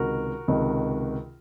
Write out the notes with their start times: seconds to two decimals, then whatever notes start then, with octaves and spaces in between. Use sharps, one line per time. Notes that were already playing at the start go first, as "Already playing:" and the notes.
Already playing: C#2 C3 D#3 F#4 A#4
0.48 C#2 C3 D#3